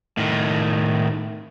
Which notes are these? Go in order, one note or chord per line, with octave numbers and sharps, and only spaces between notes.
A2 D#3